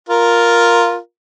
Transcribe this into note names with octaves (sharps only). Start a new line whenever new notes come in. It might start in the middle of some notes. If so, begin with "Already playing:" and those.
F4 A#4